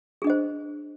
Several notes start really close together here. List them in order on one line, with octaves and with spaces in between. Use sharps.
G#4 D4 D#5 C5